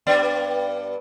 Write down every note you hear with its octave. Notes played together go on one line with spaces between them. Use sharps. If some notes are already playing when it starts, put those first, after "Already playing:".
G2 B3 D5